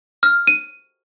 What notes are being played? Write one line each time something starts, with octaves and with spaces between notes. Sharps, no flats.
F6
D#7